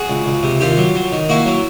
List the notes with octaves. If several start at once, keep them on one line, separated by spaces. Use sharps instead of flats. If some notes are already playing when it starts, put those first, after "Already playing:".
Already playing: F#4 G#4
C#2
C#2
C3
D#2 F4 G4
F#3
F#3
D#3
A#3 E4 F#4
F#3